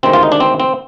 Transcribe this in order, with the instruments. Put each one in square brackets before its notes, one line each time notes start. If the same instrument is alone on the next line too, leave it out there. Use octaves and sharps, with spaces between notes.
[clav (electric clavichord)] D2 C3 D#3 G#3 C4
F4
D#4
D4
C4
C4